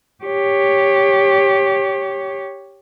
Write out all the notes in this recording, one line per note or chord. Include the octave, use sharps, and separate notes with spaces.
G4 C#5